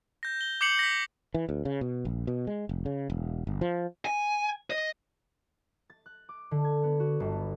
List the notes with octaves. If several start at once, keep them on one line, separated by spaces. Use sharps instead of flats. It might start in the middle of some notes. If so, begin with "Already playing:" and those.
G6 A#6
G7
D6 G6 C7 C#7 F#7
A#6 B6
E3
D2
C#3
B2
A#1
B2
G#3
F1
C#3
E1
G1
F3
G#5
D#5
A6
F#6
D6
D3
G#6
B3
F#4
G1
B3